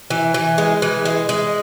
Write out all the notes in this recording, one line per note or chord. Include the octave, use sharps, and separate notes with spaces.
E3
E3
G#3
E3
G#3
G#3